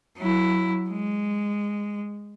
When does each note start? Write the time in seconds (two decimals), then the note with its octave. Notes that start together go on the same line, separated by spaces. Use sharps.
0.18 F#3 E4
0.90 G#3